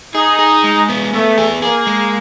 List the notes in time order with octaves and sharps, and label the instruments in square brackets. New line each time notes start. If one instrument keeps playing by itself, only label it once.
[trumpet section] D#4 [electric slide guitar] G#4
[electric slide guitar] G#4
G#3
B3
[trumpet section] A3 [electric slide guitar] B3
[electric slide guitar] G#4
[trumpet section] A#3 [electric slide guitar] G#4
[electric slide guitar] G#3